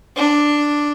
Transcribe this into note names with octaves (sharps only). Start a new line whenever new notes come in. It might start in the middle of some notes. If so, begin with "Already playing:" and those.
D4